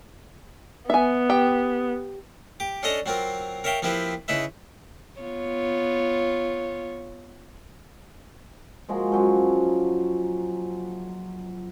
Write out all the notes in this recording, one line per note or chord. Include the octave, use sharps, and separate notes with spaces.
B3 E5 G#5
G4 G5
G4 D6
C#4 D4 A4 D#5 A#5
F#3 C4 F4 A#4
A#4 C#5 E5 F5 G5
F3 A#3 C4 E4 G4 B4
C#3 D#4 E4 B4 E5
B3 F4 C#5
F3 G#3 A#3 F#4
F3 F#3 C#4